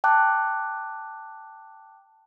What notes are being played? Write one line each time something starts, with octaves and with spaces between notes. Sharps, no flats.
G5 A5 D6 F#6